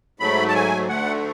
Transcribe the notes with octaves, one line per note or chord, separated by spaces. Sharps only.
G#2 F#3 A3 B5
A5
G#5
D2 D3 A3 F#5